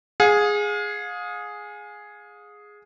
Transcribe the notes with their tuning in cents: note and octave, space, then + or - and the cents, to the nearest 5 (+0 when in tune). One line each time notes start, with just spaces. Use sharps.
G#4 +0 F5 +40